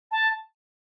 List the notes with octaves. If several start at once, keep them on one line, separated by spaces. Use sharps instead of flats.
A5